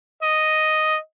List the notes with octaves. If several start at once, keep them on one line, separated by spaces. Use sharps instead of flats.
D#5